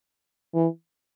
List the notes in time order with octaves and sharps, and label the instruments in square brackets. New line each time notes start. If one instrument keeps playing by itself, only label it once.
[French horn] E3